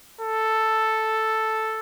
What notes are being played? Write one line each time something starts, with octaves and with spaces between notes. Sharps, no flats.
A4